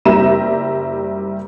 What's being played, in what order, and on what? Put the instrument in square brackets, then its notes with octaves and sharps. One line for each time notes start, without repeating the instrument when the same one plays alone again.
[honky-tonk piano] F#1 G3 G4 E5 A#5 E7